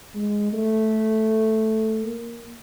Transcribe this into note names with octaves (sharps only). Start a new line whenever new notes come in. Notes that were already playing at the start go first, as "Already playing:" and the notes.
G#3
A3
A#3